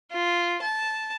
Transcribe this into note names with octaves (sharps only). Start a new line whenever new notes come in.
F4
A5